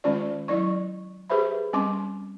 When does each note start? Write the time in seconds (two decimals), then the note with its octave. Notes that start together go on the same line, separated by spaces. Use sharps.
0.04 D#3 G#3 C#4 F4 D5
0.48 F#3 E4 D5 C#6
1.30 G4 G#4 B4 C5 E5 B5
1.73 G3 C4 C#4 C6 D6